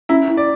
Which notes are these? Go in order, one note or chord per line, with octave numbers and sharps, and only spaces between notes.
C#4 E4
E4
D5